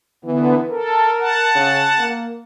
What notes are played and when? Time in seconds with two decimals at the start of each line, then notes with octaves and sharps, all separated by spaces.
0.24 D3 E3 B3
0.70 A4 A#4
1.20 F#5 A5
1.56 C#3
1.99 A#3